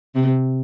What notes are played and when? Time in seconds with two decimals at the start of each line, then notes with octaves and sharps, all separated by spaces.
0.15 C3